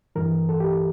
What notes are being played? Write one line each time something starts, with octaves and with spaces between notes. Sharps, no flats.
G2 E3 A#4
A4
G4